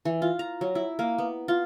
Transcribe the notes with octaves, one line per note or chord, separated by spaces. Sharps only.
E3
F4
A#5
F#3
E4
A#3
B3
F4